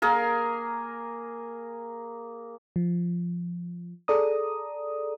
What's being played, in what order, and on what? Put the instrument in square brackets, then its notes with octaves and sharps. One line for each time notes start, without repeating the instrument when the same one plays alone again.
[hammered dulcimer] A#3 G#4 A#4
[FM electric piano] F3
G#4 A4 D5 A#5 D#6